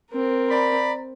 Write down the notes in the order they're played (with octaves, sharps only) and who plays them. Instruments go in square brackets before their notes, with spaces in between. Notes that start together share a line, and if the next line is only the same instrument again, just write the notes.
[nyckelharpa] C4 A#4
[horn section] D5 A#5 B5